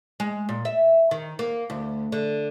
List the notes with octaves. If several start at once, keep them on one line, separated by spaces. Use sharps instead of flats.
G#3
A#2
E5
D#3
A#3
D2
D3